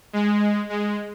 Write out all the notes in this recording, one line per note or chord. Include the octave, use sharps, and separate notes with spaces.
G#3
G#3